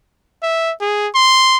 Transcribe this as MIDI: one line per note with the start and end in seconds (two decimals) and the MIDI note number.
0.43 0.72 76
0.81 1.08 68
1.15 1.57 84